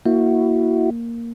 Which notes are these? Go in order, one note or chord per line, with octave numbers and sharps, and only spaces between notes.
A#3 E4 F#4